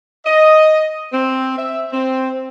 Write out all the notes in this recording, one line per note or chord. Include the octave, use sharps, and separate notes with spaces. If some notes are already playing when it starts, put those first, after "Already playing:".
D#5
C4
E5
C4